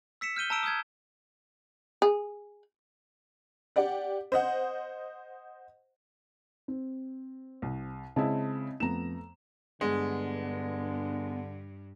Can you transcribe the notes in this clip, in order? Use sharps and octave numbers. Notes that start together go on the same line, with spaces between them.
E6 B6 C#7 E7
F6 G6 D#7 G7
A5 A#5 E6 D7 E7
D#6 F6 G6 G#6
G#4
G4 D5 F#5
C5 D#5 F#5
C4
C2
C#3 G#3 C4 E4 D#5 A5
F2 A3 B3 A#5 E7
G2 D3 G#3 B3